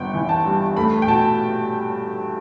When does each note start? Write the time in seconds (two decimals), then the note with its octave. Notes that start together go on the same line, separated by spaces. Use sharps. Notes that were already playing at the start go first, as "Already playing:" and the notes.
Already playing: G1 B3 F#5 G5
0.14 E3
0.29 A5
0.45 G2
0.77 A3 B5
1.02 G5
1.07 B2 A5